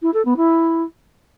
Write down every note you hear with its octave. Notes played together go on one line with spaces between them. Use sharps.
E4
A4
B3
E4